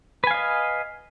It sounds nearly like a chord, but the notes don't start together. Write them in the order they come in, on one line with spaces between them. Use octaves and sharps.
B4 G#5 F5 D#5